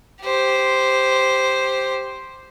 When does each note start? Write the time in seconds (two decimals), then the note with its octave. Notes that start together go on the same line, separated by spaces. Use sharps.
0.22 G4 C5